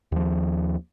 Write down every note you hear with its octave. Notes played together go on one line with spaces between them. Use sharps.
D#2 F3